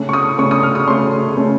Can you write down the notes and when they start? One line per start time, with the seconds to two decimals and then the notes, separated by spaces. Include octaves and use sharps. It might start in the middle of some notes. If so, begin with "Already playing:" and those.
Already playing: C#3 A3 C#4
0.09 C#6
0.13 D#6
0.38 C#3 A3 C#4 C#6
0.51 D#6
0.63 F6
0.75 D#6
0.87 C#3 A3 C#4 C6
1.37 C#3 A3 C#4